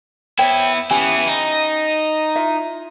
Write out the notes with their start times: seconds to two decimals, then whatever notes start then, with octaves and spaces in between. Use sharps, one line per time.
0.38 B3 E4 C5 C#5 G5
0.91 E3 B3 C#4 G4 G#5
1.27 D#4
2.36 E4 F4 E5